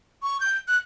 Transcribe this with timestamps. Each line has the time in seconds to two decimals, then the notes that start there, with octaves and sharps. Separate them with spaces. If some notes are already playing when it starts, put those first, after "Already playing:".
0.23 C#6
0.40 G6
0.68 F#6